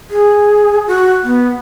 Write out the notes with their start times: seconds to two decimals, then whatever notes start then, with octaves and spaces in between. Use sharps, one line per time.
0.10 G#4
0.87 F#4
1.23 B3